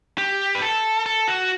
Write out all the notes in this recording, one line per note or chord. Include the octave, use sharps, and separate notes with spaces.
G4
B4
A4
A4
F#4